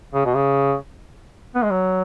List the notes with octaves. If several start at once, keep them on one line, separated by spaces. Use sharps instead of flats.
C#3
B2
C#3
B3
G#3
F#3